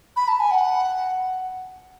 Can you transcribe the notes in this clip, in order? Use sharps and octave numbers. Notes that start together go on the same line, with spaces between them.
B5
A5
G#5
F#5